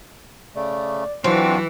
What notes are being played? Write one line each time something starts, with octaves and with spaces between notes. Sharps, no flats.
C#3 A3 D5
E3 F#3 C4 D4 F4 F#4